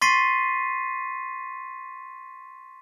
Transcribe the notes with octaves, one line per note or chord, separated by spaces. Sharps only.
C6 C#6 A6 B6 C7 D#7